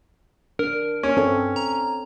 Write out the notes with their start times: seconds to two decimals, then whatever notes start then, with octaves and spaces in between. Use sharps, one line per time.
0.59 D4 A#4
1.03 C#4
1.17 G2 C4 A4 C#5
1.56 A#5